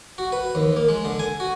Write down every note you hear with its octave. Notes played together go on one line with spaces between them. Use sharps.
F#4
B4
D#2
A#3
G#3
D3
G#5
F#4